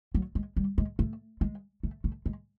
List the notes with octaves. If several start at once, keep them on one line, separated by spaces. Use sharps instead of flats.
F#3
G#3
G3
G#3
A3
G#3
A3
A3
G#3